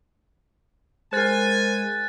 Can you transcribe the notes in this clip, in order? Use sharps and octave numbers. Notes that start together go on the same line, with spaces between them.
G#3 A#4 C5 G#5 F#6 A6